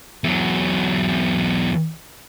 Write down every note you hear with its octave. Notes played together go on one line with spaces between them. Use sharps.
E2 F#3